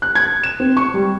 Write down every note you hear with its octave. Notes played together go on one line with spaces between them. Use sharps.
F#6
G#6
E7
C4
C#6
G3